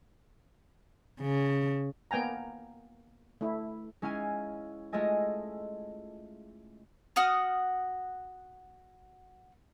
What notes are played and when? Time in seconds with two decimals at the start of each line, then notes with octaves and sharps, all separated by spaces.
1.21 C#3
2.11 A#3 B3 G5 G#5 A#5
3.41 A3 E4
4.02 G#3 C#4 E4 F5 G#5
4.93 G#3 A3 F4 A4 D#5 G#5
7.16 F#4 F#5 D#6 F6